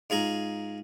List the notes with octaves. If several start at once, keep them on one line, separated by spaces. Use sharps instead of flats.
G#2 F4 G#4 A#5